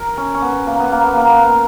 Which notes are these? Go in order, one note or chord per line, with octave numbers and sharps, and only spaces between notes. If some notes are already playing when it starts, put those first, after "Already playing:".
Already playing: A#4
C#4
C#4
B3
A#3
B3
A#3
B3
A#3
B3
A#3